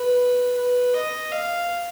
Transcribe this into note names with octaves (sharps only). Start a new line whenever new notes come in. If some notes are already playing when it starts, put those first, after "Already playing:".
Already playing: B4
B4
D#5
F5